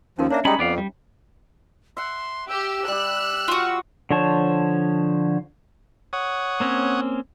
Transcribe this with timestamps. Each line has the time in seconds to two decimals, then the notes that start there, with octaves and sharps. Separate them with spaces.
0.19 D#2 F3 C#4 D#4 A#4
0.31 A#3 D4 C#5 E5
0.45 G3 G#3 C#4 D#4 G5 A5 B5
0.59 F2 B3 D5 F5
0.78 G3
1.97 E5 F#5 C6
2.49 G4 E6
2.88 G3 G4 F#6
3.48 F4 F#4
4.11 D3 F3 C5 C#5 A5
6.13 C#5 F#5 D#6
6.60 A#3 C4 C#4